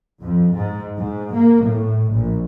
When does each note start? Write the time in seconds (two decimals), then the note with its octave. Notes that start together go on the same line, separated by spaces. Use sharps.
0.23 F2
0.56 G#2
0.98 G#2
1.33 A#3
1.66 A2
2.12 A#1